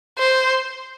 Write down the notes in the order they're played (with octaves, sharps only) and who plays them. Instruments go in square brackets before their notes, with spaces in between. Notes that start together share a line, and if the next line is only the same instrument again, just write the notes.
[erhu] C5